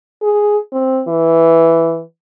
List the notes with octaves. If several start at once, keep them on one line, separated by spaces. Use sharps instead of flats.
G#4
C4
E3